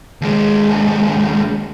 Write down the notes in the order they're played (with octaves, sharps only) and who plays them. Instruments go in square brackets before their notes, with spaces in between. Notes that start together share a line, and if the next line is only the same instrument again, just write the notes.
[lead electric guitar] D#2 G#3